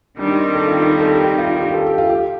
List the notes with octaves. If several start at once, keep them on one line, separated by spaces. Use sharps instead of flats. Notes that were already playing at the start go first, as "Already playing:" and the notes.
D#3 G3 C4 D4
D#4
A4
F4
D#4
A4
G4
F4
G4
A4
G4
F4
G4